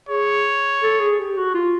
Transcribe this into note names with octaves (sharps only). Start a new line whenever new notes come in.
G#4 C#5
A4
G#4
G4
F#4
F4